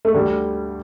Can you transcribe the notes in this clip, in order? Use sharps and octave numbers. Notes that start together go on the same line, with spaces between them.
A3
D2 D3 G3